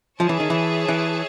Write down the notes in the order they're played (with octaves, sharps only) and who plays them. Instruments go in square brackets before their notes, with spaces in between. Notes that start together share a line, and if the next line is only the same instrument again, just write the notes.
[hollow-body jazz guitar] F3 [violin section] G#4 C#5 E5 A5
[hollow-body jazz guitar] E3
D#3
E3
E3